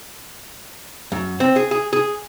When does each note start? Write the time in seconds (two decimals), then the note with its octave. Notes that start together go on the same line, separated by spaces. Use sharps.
1.12 F#2
1.40 C4
1.56 G#4
1.71 G#4
1.93 G#4